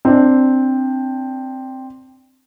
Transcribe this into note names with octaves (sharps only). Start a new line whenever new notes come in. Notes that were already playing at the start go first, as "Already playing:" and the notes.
C4 D4